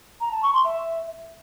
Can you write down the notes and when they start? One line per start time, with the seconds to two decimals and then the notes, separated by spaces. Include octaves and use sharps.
0.21 A#5
0.32 A5
0.43 C#6
0.54 C6
0.64 E5